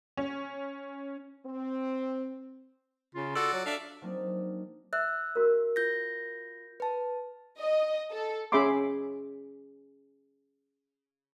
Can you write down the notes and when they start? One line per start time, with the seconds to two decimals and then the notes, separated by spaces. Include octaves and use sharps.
0.17 C#4
1.47 C4
3.15 C#3 F4
3.35 F#4 A4 D5
3.53 F#3
3.66 D4 A4 D5 E5 F5
4.02 F3 F#3 A#3 C4 D4 D#4
4.93 E5 E6 F#6
5.36 F#4 A#4
5.76 F4 G6 A#6
6.80 B4 A5
7.59 D#5
8.11 A4
8.52 C#4 G#4 E5 B5 C6 D6